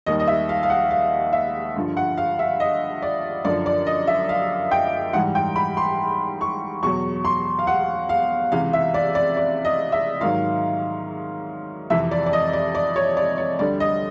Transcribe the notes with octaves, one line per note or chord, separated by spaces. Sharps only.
D#2 D#3 G3 D#5
D#5
E5
F5
F5
F#5
F5
E5
G2 D3 F3
F#5
F5
E5
D#5
D5
F#2 D3 F3 D5
D5
D#5
E5
F5
G5
G#2 E3 G3 F#5
G5
B5
C6
C#6
E2 B2 F#3 C#6
C6
F5
F#5
F5
C#2 C3 E3 F5
E5
D5
D5
D5
D#5
E5
G#2 D#3 F#3 F5
F2 C3 E3 E5
D5
D5
D#5
D5
D5
C#5
D5
C#5
D2 D3 G3 D5
D#5